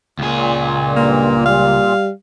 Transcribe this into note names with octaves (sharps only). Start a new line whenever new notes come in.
C#2 A#2 G#4
G2 A#3
G3 F5